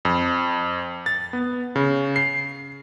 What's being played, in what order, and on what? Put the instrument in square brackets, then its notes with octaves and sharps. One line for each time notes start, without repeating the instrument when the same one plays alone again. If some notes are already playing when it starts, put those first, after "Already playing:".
[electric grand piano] F2
A6
B3
C#3
C7